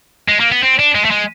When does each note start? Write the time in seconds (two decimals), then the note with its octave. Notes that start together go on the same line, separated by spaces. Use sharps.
0.28 G#3
0.40 A#3
0.52 B3
0.63 C4
0.79 D4
0.95 G#3
1.05 A3
1.11 G#3